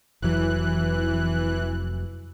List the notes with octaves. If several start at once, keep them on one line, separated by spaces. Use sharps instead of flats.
F1 F2 E3 F#3 F#6